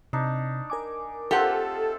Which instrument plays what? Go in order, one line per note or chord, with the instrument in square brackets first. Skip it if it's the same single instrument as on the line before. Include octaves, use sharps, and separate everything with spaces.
[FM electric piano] C3 [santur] D4 D#4
[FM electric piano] A#4 G#5 D6
[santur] A3 C4 F4 [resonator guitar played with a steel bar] G4 F#5 [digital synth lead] A4